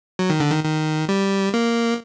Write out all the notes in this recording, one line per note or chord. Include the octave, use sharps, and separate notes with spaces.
F#3
D#3
D3
D#3
D#3
G3
A#3